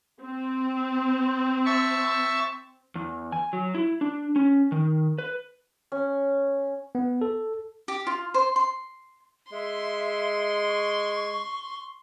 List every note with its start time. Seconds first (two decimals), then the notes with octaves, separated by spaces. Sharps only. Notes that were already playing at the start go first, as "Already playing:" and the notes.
0.21 C4
1.65 E5 A5 C#6
2.95 E2
3.32 G#5
3.53 F#3
3.75 E4
4.01 D4
4.36 C#4
4.72 D#3
5.18 B4
5.92 C#4
6.95 B3
7.21 A4
7.88 G4
8.07 F4
8.34 C5
8.56 C6
9.52 G#3 E5 C6
10.68 C#6